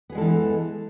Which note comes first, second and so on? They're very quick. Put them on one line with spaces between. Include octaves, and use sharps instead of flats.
B3 G#4 G#3 A4 E3